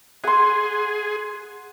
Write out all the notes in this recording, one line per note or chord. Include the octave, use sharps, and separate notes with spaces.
G#4 F#5 C6